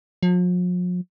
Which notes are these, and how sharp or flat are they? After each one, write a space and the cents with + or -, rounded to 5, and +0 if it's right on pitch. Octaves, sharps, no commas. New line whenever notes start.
F3 +45